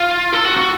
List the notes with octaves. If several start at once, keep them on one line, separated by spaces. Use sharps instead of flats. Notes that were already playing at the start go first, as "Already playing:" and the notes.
Already playing: F4
A4
F#4
F#4